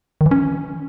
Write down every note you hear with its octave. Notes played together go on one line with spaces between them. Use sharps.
D#3
E3
C#4